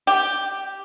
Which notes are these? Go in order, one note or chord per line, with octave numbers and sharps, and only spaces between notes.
G4